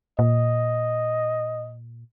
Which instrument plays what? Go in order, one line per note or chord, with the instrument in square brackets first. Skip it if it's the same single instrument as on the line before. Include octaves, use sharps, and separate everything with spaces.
[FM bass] A#2 [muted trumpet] D#5